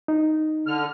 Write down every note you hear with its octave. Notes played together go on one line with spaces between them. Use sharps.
D#4
D3 F6